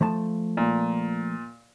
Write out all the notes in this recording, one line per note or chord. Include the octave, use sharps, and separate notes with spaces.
F3 A3 A5
A#2